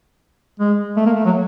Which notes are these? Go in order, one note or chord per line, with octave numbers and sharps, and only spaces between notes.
G#3
A3
A#3
A3
F#3